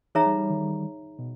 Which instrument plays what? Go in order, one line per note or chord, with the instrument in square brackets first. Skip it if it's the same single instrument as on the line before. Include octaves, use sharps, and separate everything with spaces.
[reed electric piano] E3 [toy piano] D#4 G#4 C#5 E5 A#5
[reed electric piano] G3
G3
D#3
B2